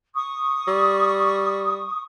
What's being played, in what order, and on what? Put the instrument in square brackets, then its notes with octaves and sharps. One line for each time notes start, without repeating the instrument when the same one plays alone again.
[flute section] C#6 D#6
[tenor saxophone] G3